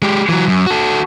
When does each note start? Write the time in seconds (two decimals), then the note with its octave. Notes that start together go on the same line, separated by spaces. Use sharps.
0.02 G#3 G4
0.29 E3 F#3
0.49 F#2
0.66 F#4 A4